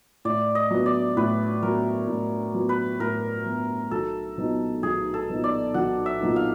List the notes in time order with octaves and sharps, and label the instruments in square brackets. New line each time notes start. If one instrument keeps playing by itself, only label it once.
[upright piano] A2 [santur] D5
[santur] D#5
[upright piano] F#3 B3
[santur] D5
[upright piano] A2 [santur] B4
[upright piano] F#3 B3 [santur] A#4
[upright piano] A2
F#3 B3
[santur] B4
[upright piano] A2 [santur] A#4
[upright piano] F#3 B3
[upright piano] B1 [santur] A4
[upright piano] A#2 F#3 B3 D#4
[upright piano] B1 [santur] G#4
[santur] A4
[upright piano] A#2 F#3 B3 D#4
[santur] D5
[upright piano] B1 [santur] F#5
[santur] E5
[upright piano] A#2 F#3 B3 D#4
[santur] F5